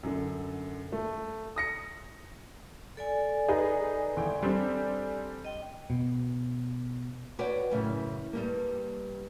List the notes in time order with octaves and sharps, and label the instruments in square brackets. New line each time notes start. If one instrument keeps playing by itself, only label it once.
[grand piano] F#2 D3
A3
D#6 A#6 C#7
[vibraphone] A4 D5 G#5
[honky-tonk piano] D#4 G#4 B4
G1 E3 G5
G3 C4 D4
[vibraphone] D#5 G5
[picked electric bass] B2
[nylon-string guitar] F#4 B4 C#5 D5 F#5 G5
F#2 A2 C#3 E3
G2 G3 A#3